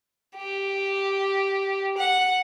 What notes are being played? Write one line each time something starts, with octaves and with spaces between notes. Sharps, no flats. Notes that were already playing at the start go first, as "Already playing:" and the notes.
G4
F#5